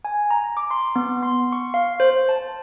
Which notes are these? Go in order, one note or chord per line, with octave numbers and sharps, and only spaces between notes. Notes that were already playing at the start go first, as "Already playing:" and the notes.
G#5
A#5
D6
C6
B3
C6
C#6
F5
C5
A5